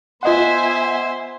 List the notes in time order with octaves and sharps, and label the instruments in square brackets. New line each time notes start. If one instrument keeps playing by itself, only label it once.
[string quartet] B3 E5 G#5 [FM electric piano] F4 D#5 F#5 [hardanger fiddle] C5